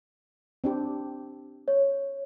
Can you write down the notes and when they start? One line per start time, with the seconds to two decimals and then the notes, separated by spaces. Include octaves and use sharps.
0.64 C4 D4 G4
1.68 C#5